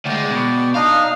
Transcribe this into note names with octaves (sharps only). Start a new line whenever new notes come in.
D2 G#3 D5 G5
B2
D4 D#4 D#5 F5